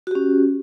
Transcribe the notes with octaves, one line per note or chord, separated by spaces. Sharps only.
C#4 F#4 G4